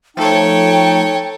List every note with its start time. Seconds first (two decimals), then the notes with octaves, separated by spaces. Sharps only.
0.17 F3 A3 D#4 A4 C#5 G5